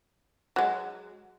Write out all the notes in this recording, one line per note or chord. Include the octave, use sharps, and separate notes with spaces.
F#3 G#3